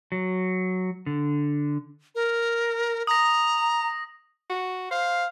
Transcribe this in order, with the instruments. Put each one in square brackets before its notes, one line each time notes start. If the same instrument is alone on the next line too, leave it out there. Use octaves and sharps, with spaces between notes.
[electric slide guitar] F#3
D3
[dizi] A#4
[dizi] A#5 [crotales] D#6 A#6
[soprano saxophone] F#4
[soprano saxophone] C5 [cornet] F5